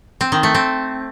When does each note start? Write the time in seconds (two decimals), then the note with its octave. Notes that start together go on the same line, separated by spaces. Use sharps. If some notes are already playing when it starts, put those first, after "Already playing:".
0.21 C4
0.32 D#3
0.43 A3
0.55 C4